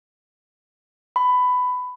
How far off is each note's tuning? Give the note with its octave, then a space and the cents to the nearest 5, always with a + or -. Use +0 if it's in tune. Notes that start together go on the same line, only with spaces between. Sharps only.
B5 +15